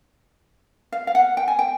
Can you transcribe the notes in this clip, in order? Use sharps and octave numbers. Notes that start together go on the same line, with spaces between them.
F5
F5
F#5
G5
G#5
G5